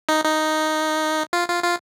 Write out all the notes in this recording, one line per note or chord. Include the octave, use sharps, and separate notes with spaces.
D#4
D#4
F4
F4
F4